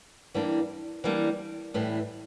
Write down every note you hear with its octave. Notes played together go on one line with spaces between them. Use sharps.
E3 G3 A#3 D4
E3 G3 A#3 D4
A2 E3 G3